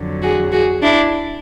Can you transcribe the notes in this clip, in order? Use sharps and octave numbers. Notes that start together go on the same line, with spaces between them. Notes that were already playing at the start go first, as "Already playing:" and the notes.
Already playing: F2 D3 F#3
F#4 G#4
F#4 G#4
D4 E4